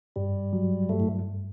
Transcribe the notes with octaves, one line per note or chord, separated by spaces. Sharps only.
G2 G3
F#3
G2 A3
A2